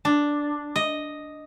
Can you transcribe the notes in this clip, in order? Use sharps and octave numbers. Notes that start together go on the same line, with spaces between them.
D4
D#5